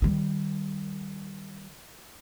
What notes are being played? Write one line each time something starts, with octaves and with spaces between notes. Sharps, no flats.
D#3 G3